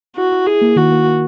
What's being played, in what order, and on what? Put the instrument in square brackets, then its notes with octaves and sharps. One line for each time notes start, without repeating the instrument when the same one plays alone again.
[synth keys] E4 [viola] F#4
[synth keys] E4
[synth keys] E4 [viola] G#4
[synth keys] A#3
[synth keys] D#3 [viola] F#4
[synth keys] A#3
A#3